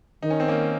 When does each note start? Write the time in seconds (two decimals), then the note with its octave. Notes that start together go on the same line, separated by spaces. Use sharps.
0.22 D#3 D#4
0.30 C#4
0.40 C4
0.48 A#3 C#4